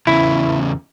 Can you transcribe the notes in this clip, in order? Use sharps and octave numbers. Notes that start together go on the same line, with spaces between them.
E2 C#3 E4